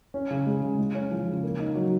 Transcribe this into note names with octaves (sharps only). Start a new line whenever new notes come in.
C#4
C#3
G#3
C#3
G#3
C#4
F3
C#3
A#3
D#4
F#3